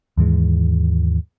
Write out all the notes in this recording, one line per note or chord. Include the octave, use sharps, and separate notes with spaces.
D#2 G#2 E3 G#3